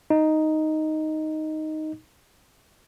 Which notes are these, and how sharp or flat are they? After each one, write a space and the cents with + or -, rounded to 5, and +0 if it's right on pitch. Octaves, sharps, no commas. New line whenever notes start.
D#4 +0